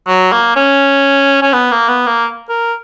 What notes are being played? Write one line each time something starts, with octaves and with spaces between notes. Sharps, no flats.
F#3
A#3
C#4
C#4
B3
A#3
B3
A#3
A#4